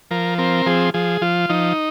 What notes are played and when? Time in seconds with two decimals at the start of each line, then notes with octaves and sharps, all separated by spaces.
0.11 F3 A#4
0.38 C4 A#4
0.66 F3 G#4
0.94 F3 G#4
1.21 F3 F4
1.49 F3 D#4